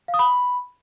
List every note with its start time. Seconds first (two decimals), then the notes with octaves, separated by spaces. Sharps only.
0.08 F5
0.14 D#6
0.19 B5